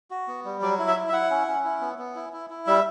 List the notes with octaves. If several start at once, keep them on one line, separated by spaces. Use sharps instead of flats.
F#4
B3
G3
F#3 D5
E4
E5
E4
E5
E4 F#5
C#4
C#4
E4
B3
B3
E4
E4
E4
G3 E5